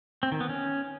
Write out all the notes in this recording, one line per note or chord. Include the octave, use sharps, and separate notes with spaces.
C4
D#3
B3
C#4